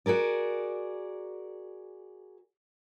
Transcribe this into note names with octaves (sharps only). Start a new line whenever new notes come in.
F#4 G#4 A#4 D5